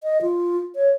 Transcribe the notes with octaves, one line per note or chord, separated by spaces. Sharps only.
D#5
F4
C#5